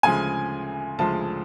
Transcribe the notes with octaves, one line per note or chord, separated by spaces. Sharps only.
D2 C#3 F3 G#3 G#5
D2 C#3 F3 G#3 A5